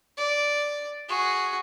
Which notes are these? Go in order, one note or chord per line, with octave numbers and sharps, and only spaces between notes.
D5
F#4 G#4